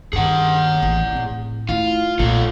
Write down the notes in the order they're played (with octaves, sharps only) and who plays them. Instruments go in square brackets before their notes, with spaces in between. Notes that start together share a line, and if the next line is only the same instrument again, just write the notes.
[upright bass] G2 D#3 [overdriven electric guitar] G#4 F#5
[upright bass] A1 E3
A2 C4
[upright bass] A3 E4 [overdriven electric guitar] F4
[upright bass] B1 A#2 [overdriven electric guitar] A3 F4